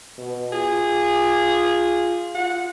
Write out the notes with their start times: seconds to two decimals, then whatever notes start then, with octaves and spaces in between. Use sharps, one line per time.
0.18 B2
0.53 F4 G#4
2.35 F4 F#5